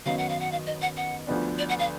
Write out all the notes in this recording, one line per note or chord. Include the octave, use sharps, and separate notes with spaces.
F#2 D#3 F#3 B3 D#4 F5
F#5
F5
F#5
F5
D#5
F#5
F#5
D2 D3 F3 B3 D4
D5
F#5
F5